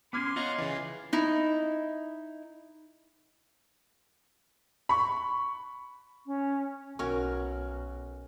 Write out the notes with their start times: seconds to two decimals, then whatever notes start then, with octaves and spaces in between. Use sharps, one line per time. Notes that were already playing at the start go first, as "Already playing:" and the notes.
0.13 B3 C#4 C6 D6 F6 G#6
0.36 F4 C#5 D#5 F5 F#5 A#5
0.58 C#3 E3
1.13 D#4 E4
4.89 B5 C#6
6.27 C#4
6.99 B1 C#4 F#4 A#4 G#5 C#6